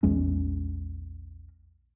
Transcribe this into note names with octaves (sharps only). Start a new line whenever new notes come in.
A#1 E2 G#3 C#4